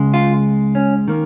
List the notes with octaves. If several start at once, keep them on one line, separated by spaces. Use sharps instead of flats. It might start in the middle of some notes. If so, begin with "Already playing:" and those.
Already playing: C#2 C#3 G#3
F4
C#4
D#3 A#3